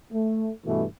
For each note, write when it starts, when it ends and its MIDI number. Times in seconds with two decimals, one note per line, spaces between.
0.12 0.50 57
0.66 0.85 43
0.66 0.85 47
0.66 0.85 52
0.66 0.85 57